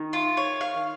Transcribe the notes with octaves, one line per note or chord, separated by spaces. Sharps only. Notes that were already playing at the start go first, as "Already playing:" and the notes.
Already playing: D#3
F4
C#5
F5